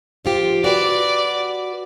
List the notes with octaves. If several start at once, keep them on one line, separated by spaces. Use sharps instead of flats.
F3 F4 G4
F#4 B4 D5